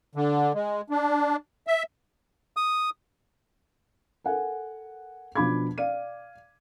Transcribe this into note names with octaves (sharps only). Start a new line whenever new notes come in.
D3
G#3
D4
E5
D#6
A4 A#4 F#5 G#5
B2 F3 D4 B5 D6 G#6
D5 F5 D#7